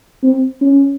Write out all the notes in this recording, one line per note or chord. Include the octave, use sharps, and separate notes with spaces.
C4
C#4